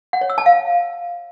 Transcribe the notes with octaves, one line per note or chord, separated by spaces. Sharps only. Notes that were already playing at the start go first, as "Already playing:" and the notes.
F#5
C#5
E6
A5
F5